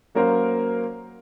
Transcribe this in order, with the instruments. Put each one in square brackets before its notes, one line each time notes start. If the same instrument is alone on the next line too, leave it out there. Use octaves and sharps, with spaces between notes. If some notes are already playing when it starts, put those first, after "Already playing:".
[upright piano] F#3 A#3 C#4 A#4 C5 F5